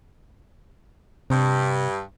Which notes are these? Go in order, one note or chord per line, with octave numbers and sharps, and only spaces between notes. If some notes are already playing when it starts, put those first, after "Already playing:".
G2 C3